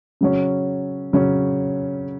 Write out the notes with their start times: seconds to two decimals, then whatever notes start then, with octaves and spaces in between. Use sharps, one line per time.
0.21 C#3 F#3 C#4
1.13 C#3 F#3 C#4